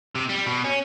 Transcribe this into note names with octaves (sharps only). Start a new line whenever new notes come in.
C3
G3
B2
C#4